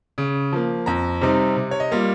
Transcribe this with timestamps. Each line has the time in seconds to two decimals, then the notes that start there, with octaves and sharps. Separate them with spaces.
0.18 C#3
0.53 F3 A#3
0.86 F2 A#5
1.21 C3 G3 C4 D#4
1.56 C3
1.71 C#5
1.80 D#5
1.91 G3 A#3 F4